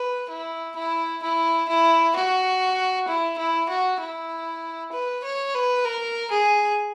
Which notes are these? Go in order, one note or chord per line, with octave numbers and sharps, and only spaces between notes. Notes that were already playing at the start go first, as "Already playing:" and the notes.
Already playing: B4
E4
E4
E4
E4
F#4
E4
E4
F#4
E4
B4
C#5
B4
A#4
G#4